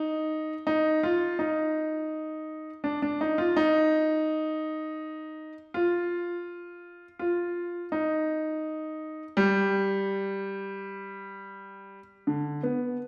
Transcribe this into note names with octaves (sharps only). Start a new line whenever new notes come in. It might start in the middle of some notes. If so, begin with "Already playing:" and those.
Already playing: D#4
D#4
F4
D#4
D4
D4
D#4
F4
D#4
F4
F4
D#4
G3
D3
B3